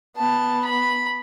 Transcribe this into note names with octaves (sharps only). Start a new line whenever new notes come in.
B3 A5
B5